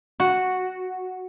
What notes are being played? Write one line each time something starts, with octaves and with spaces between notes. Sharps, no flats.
F#4